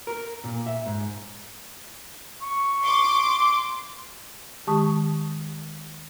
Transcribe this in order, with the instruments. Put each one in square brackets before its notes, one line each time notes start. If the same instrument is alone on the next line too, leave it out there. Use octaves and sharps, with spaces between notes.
[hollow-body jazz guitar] A#4
A#2
E5
G#2
[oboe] C#6
[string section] C6 D6
[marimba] D#3 G#3 G4 A5 C#6 D#6